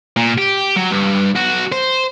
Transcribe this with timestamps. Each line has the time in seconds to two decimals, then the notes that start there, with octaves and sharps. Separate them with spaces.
0.17 A#2
0.38 G4
0.76 F#3
0.91 G2
1.36 B1 F#4
1.72 C5